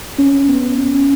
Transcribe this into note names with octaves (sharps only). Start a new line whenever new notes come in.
C#4
B3
C#4